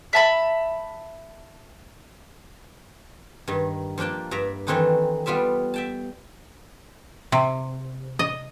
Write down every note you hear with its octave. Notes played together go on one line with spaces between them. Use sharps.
E5 A5 B5
G2 D#3
F3 A#3 D4 G5 A5
G2 D5 E5 A#5
D#3 E3 A3 C4 D4 D#4
G3 B3 F4 D5 E5
E5 G5 A5
C3
D#5